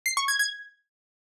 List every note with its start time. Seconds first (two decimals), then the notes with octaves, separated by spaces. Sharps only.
0.06 C7
0.17 C#6
0.28 G#6
0.39 G#6